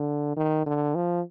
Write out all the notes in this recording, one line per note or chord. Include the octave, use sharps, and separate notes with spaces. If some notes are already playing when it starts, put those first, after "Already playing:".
Already playing: D3
D#3
D3
F3